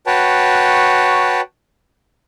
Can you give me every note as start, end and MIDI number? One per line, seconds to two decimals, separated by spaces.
0.07 1.41 66
0.07 1.41 71
0.07 1.41 73
0.07 1.41 79
0.07 1.41 81